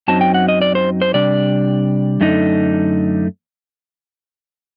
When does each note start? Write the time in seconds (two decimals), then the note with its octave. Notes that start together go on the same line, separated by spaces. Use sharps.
0.08 F#2 F#3 C4 D#4 A5
0.21 G5
0.34 F#5
0.49 D#5
0.62 D5
0.75 C5
1.02 C5
1.14 C3 G3 D4 D5
2.21 F#2 D3 A3 D#4